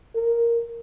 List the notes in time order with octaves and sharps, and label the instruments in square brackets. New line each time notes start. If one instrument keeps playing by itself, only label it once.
[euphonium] A#4